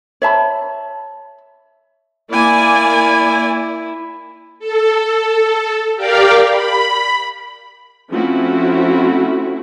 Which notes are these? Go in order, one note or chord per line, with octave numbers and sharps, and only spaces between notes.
C#5 E5 A5 B5
A#3 E4 D5 G#5
A4
G4 A#4 D5 F5 G5
B5
F3 A3 C4 C#4 E4 F#4